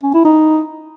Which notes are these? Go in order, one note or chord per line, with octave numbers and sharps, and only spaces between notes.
C#4
E4
D#4